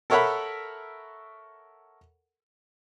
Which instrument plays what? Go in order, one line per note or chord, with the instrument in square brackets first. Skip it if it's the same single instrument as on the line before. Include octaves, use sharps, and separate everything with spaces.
[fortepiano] A4 A#4 C#5 E5 F#5 B5